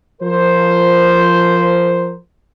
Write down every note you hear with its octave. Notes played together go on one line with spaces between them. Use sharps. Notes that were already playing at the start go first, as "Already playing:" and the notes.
F3 A#4 C5